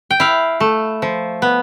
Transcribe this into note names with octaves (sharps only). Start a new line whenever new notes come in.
G5
E4 F5
A3
F3
B3